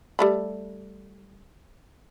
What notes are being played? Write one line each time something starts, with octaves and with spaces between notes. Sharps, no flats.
G3 A3 B5